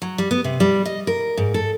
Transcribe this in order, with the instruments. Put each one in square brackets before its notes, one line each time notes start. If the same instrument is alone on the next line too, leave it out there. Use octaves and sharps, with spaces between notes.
[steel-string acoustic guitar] F#3
G3
B3
C3
G3
D#5
A#4
G#2
A4